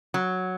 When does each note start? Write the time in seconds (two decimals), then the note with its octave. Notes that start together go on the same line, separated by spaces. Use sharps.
0.14 F#3